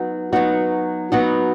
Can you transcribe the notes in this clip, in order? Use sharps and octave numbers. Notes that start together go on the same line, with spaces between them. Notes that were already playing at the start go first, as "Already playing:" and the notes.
Already playing: F#3 B3 D#4 F#4
F#3 B3 D#4 F#4
F#3 B3 D#4 F#4